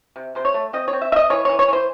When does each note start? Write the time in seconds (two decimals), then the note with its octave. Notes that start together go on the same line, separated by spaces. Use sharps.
0.16 C3
0.35 C3 C5
0.45 C#5
0.54 A3
0.73 C4 D#5
0.88 C#5
0.93 C4
1.02 E5
1.12 C4 E5
1.16 D#5
1.30 E3 C#5
1.45 E3 C#5
1.59 C#5
1.68 E3 C5